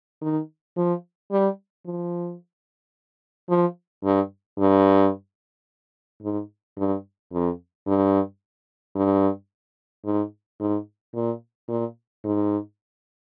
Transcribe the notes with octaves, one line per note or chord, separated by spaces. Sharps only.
D#3
F3
G3
F3
F3
G2
G2
G#2
G2
F2
G2
G2
G#2
G#2
A#2
A#2
G#2